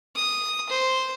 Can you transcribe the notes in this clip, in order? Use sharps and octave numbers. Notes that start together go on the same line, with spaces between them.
D#6
C5